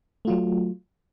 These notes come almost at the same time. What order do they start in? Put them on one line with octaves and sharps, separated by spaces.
A3 F4 F#3